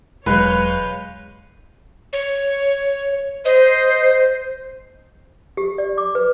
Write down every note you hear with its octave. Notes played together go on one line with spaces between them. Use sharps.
E1 F#3 G#3 B4 C#5 F5 G6
C#5
C5 D#5
G4
D5
D6
B4